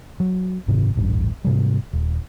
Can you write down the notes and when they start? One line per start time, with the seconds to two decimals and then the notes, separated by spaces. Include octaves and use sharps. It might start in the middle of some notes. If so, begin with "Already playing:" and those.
0.20 F#3
0.68 F#1 G#2 C3 D#3
0.95 D#1 A1 G2
1.45 G#2 C3 G3
1.93 D#1